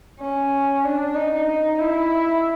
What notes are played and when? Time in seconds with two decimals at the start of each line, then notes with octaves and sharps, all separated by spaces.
0.21 C#4
0.84 D4
1.15 D#4
1.48 D#4
1.79 E4